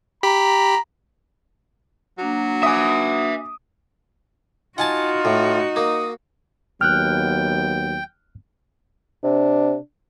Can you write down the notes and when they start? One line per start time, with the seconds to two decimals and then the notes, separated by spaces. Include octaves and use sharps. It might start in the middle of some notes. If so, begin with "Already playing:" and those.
0.23 G4 A#5 B5 B6
2.18 F#3 A#3 D4 F#4
2.63 E5 G#5 D6 D#6
4.78 D#4 F4 F#4 F#5 G#5 A5
5.25 A2
5.76 A#3 D#6
6.81 D#2 F#3 B3 G5 F6 F#6
9.24 C3 D4